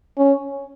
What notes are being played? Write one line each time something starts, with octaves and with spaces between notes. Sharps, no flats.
C#4